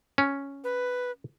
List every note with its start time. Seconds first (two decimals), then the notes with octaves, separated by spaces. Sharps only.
0.18 C#4
0.64 B4